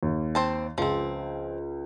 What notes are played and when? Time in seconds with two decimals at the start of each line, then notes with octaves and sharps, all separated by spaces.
0.03 D#2
0.35 C4 C5 A5
0.78 C#2 F3 C4